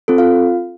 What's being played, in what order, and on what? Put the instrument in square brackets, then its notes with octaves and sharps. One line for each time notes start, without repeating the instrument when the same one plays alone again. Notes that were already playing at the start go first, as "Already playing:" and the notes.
[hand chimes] C4 F4 A4
F4 F5